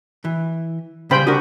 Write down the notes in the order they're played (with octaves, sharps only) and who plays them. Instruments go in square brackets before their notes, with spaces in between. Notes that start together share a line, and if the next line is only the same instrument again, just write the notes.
[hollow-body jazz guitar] E3
[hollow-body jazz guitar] C#3 G3 [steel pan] C5 G5 B5
[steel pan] D4 F#4 D#6 [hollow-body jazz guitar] G4 A#4